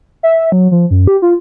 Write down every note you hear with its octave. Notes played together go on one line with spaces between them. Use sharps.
E5
F#3
F3
F#2
G4
F4